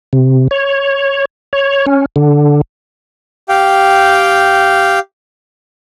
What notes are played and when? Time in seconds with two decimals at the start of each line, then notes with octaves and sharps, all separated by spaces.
0.13 C3
0.51 C#5
1.53 C#5
1.86 C#4
2.16 D3
3.49 G4 F5 G5